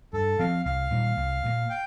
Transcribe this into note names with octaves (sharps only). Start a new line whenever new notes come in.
G2 A4
F3 C4 F5
C2 F5
A#2 G3 A#3
C2
A#2 G3 A#3
G5